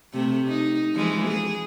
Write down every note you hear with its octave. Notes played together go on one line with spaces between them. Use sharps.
C3 A3
D#4
E3 F3 G#3
G#4